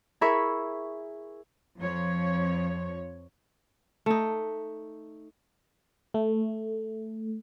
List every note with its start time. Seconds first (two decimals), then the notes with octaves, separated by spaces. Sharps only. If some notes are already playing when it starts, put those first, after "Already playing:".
0.21 E4 G#4 A#4 E5 B5 C#6
1.79 F2 F3 C#5
4.06 A3 D#4
6.14 A3